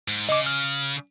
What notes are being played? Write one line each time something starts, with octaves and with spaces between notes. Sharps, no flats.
G#2
C#3 D#5 D6
F6